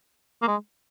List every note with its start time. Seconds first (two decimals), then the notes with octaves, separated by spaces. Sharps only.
0.42 A#3
0.48 G#3